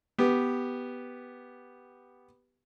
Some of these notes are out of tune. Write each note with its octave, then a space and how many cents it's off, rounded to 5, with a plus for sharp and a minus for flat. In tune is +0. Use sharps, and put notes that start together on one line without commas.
B3 +0 G4 +0